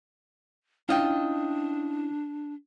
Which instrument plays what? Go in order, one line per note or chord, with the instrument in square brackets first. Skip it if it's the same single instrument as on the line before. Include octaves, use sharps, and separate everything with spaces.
[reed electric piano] C#4 E4 [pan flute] D4 [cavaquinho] F4 D#5 G5